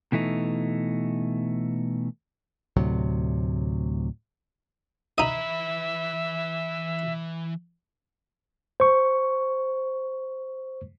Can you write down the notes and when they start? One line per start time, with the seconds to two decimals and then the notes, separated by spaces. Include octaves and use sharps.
0.12 B2 E3 A3 D#4
2.76 D2 A2 C3 F#3
5.18 E3 D#4 D#5 E5 B5
8.80 C5 C#6